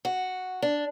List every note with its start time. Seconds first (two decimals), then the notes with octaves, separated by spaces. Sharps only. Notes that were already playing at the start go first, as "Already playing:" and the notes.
0.05 F#4
0.62 D4